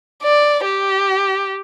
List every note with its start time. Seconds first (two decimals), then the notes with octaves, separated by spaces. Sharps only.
0.23 D5
0.65 G4